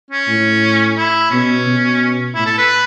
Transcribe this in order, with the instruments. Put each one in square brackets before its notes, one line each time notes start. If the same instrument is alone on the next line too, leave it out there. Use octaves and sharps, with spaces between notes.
[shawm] C#4
[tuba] A2
[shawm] E4
[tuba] B2 [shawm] C#4
[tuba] B2
[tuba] A2 [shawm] E4
[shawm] A4
B4